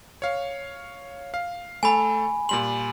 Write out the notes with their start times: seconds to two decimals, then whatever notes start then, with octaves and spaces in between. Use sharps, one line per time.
0.22 C#5 F5
1.34 F5
1.83 A3 A4 G#5 B5
2.49 A#2 G3 C6 F#7